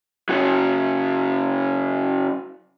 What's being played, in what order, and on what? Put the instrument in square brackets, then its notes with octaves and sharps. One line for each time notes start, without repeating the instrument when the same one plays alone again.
[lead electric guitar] C#3 F#3